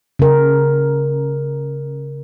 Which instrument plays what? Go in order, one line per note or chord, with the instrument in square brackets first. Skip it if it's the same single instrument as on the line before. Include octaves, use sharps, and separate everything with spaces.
[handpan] C#3 A#4